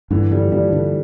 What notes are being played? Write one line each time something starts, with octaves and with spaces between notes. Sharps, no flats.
G2 D3 E3
D3 F3 G3
G2 F3 G3
D3